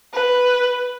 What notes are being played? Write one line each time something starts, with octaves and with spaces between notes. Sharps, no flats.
B4